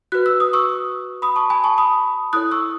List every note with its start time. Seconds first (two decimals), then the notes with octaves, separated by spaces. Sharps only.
0.12 F#4 B4 F#6
0.26 E6
0.40 D#6
0.53 C#6 E6
1.22 B5 D#6
1.36 A5 C#6
1.50 G#5 B5
1.64 A5 C#6
1.78 B5 D#6
2.33 E4 A4 C#5 D#6 F#6
2.51 C#6 E6